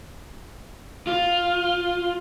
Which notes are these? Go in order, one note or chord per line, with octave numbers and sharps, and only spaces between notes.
F4